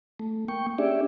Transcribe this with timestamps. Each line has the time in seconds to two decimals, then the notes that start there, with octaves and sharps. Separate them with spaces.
0.19 A3
0.48 A#3 G5 C#6
0.78 C#4 D4 G4 G#4 D5 E5